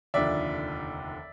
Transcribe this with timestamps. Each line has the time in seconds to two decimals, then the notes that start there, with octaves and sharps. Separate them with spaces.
0.14 F1 D#2 D3 F3 D5 E5